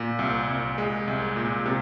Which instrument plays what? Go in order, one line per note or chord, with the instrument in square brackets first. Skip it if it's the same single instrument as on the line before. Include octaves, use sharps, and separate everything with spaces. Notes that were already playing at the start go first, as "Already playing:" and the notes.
Already playing: [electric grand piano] A#2
C2
C2
G#3
C2
A#2
C3